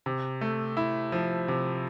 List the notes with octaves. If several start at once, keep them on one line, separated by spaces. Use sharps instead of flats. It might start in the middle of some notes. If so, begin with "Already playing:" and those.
C3
A3
E4
F3
C3